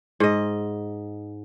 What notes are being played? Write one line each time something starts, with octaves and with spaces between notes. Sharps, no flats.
G#2 D#5